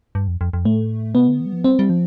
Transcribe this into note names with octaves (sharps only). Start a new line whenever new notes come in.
G2
F2
F2
F2
A2 A3
C3 B3
D3
E3
G3
F3
G3 C4
G3
F3